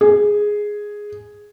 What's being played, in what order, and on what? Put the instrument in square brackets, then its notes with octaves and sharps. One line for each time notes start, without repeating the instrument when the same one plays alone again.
[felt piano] G#4